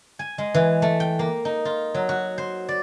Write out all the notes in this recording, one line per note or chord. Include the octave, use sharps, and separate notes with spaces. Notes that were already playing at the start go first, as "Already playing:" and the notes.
G#5
G#3
E3
A3
G5
A#3
D#4
F4
F#3
F#4
C5
D5